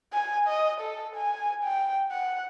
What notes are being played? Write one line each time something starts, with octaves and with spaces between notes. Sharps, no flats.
G#5
D#5
A4
G#5
G5
F#5